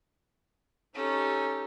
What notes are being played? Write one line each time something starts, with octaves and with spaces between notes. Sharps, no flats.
C#4 D#4 G4 A4